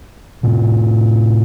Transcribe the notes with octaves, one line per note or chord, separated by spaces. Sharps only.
A2 C3